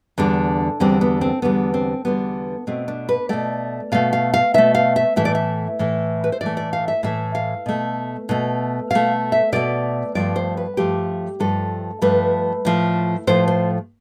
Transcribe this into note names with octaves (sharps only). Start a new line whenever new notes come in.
E2 D3 G3 D4
E2 D3 G3 C4
B3
C4
E2 D3 G3 B3
C4
E2 D3 G3 B3
B2 A3 C4
D4
B4
B2 A3 D5
B2 A3 F5
F5
F5
B2 A3 E5
F5
E5
A2 E3 A3 E5
D5
E5
A2 E3 A3
B4
C5
A2 E3 A3 D5
D5
F5
E5
A2 E3 A3 E5
F5
B2 A3
B2 A3
B2 A3 F5
E5
B2 A3 D5
G2 F3 A3 D5
C5
B4
G2 F3 A3 G4
G2 F3 A3 A4
G2 F3 A3 B4
A2 F3 A3
A2 F3 A3 C5
C5